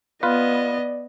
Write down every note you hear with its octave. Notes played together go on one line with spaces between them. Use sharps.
B3 F4 B4 D5 D#5